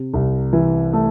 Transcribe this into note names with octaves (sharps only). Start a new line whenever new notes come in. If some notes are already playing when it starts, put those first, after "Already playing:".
Already playing: C3
C2
E3
A3